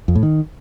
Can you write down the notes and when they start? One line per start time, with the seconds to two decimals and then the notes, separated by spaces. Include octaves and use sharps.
0.08 F2
0.15 A2
0.23 D#3